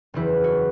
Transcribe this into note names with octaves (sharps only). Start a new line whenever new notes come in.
F#1 E2 E3 E4
F#4